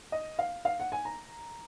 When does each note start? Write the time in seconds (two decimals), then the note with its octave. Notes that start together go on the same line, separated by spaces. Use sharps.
0.12 D#5
0.39 F5
0.65 F5
0.80 F#5
0.92 G#5
1.05 A#5